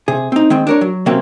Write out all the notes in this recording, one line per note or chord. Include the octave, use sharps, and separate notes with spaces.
C3 G#4
C4 D#4
D#3 G#3 C4
D4 A#4 C#5
F#3
C3 F#3 A#3 C4 C#4